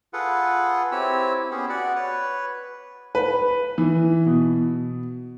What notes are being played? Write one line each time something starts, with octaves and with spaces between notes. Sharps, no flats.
F4 G#4 A4 B4 F#5
C4 E4 G4 C#5 E6
B3 C#4 G4 G#4
F#4 D5 F#5
B4 C#5
B4
E3
B2